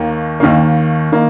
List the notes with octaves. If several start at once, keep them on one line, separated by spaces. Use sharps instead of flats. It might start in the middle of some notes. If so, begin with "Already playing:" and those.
Already playing: D#2 D#3 A#3
D#2 D#3 A#3
D#3 A#3